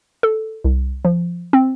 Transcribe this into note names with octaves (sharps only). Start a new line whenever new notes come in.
A4
C2
F3
C4